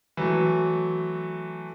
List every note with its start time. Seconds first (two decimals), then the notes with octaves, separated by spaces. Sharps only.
0.17 E3 F#3 A3